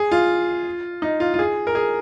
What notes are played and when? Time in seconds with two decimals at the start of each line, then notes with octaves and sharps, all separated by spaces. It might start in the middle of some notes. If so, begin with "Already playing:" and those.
Already playing: G#4
0.11 F4
1.02 D#4
1.20 F4
1.34 F4
1.39 G#4
1.67 A#4
1.75 G#4